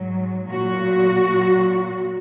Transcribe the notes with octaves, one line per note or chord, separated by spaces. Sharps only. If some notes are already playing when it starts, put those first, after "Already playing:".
Already playing: G#2 F#3
A#2 F#3 F#4
A#2 F#3